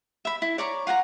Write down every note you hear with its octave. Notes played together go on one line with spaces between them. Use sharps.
E5 B5
E4
C#5 D5 A#5 C#6
F4 F#5 G#5 A#5